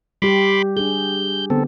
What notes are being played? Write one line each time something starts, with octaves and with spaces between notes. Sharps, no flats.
G3 G4 B5 C6 D6
D4 G#4 G6
D3 B3 C4 A4